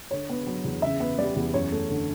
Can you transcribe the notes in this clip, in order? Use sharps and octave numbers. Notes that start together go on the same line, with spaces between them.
D3 C#5
B3
F#3
E2
C#3 E5
B3
G3 D5
E2
F#2 C#5
A3
D3